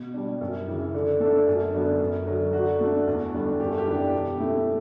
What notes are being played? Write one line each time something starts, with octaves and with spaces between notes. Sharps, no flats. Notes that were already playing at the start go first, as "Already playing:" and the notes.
Already playing: B2
G3 D4
F#2
C#3 E3
D3
A3 D4 A4
F#2
D3 F#3 B3 D4
F#2
D3 F#3
D3 F#4
A3 D4
E2
D3 G3 D4
F#2 G4
A4
G4
E3 B3 D4
B2
A3 E4